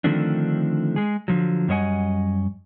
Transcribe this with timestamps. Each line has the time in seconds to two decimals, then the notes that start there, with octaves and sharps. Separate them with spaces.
0.04 D3 D#3 F3 A3 C4 D4
0.96 G#3 G#4
1.28 D3 F3 F#3
1.68 F#2 G3 C#5 D#5 F#5 G#5